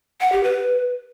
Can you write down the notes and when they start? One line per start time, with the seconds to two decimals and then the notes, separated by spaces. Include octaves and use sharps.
0.21 F#5
0.32 G4
0.44 B4